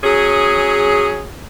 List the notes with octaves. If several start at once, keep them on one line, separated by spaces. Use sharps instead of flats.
F#3 C#4 G#4